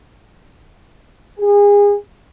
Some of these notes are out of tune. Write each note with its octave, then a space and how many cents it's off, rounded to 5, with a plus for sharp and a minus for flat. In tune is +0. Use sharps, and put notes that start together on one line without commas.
G#4 -30